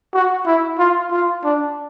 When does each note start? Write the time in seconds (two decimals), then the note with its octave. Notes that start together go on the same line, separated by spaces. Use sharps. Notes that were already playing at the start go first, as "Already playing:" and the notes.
0.13 F#4
0.46 E4
0.78 F4
1.11 F4
1.44 D4